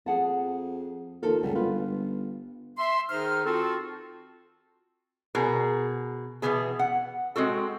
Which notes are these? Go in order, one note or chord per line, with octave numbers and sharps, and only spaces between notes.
F2 G#4 F#5 A5
D#2 F3 A4 A#4
C#2 F#2 G3
G1 F4 B4
E5 C6
D#3 D#4 G#4 C5 F6
C4 F4 F#4 A4
B2 G#4 A#4
B2 E3 F#3 B3 G#4
F#5
G#3 C4 F#4 A4